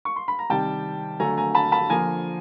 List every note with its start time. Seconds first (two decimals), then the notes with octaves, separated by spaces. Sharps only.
0.05 C#6
0.16 C6
0.28 B5
0.39 A#5
0.49 C3 D#3 G3 G5 A5
1.20 D3 F#3 A3 G#5 A#5
1.37 G#5 A#5
1.55 A5 B5
1.72 A5 B5
1.90 D3 F3 A#3 G#5 A#5